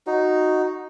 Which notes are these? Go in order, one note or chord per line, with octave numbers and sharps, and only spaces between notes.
D#4 F#4